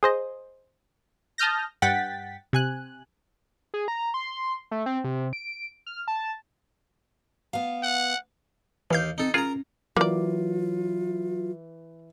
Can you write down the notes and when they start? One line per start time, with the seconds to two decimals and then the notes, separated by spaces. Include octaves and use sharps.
0.03 G#4 C5 D#5
1.38 A5 D#6 F6 G6 A#6
1.82 G2 F#5 G5 A6 B6
2.53 C3 G#5 F#6
3.74 G#4
3.88 A#5
4.14 C6
4.71 A3
4.86 C4
5.04 C3
5.33 D7
5.86 F6
6.08 A5
7.53 B3 F5
7.83 F#5
8.91 D#2 E3 F5 G6
9.18 C4 D#4 A4
9.34 C#4 F4 G#4 A#4 A#5
9.96 E3 F#3 A#3 F4 D5